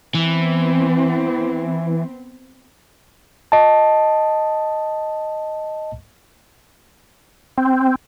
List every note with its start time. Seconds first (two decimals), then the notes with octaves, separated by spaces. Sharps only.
0.15 E3 B3 C4
3.52 D#5 A5
7.58 C4